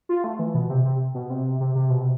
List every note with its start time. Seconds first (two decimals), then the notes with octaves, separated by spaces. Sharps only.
0.09 F4
0.24 A3
0.39 E3
0.54 B2
0.70 C3
0.85 C3
1.14 B2
1.30 C3
1.60 C3
1.75 C3
1.90 B2
2.00 C3